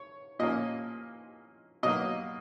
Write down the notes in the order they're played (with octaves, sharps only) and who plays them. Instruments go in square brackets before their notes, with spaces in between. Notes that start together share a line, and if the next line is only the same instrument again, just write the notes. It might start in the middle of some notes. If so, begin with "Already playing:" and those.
Already playing: [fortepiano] C#5
A#2 F3 A#3 C#4 D#5
B2 F#3 A#3 D#5